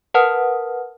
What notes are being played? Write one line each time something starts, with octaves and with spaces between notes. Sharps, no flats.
A#4 B4 F#5 A5 D#6 F6